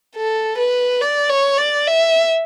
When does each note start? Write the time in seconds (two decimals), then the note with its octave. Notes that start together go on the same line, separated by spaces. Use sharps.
0.16 A4
0.58 B4
1.01 D5
1.29 C#5
1.58 D5
1.87 E5